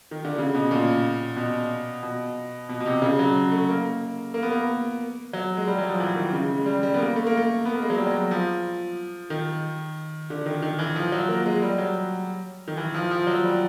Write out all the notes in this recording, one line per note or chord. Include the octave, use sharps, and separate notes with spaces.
D#3
D3
C#3
B2
A#2
B2
B2
B2
B2
C3
C#3
F#3
A3
A#3
A#3
B3
A#3
F#3
G#3
G3
F#3
F3
E3
D#3
C#3
G#3
G3
G3
B3
A#3
A3
A#3
A3
B3
A#3
G#3
F#3
G3
F#3
F3
D#3
D3
D#3
D#3
E3
F3
F#3
A#3
G#3
G3
F#3
D#3
E3
F3
F3
F#3
G3